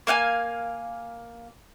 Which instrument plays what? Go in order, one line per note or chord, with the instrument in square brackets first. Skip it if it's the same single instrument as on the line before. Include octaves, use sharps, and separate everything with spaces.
[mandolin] A#3 F5 F#5 G#5